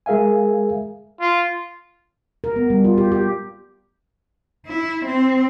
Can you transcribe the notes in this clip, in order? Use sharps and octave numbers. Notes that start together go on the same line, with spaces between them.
G#3 G#4 A#4 E5 F5 G#5
F4
A#4
B3
G3
F4
G4
G4
E4
C4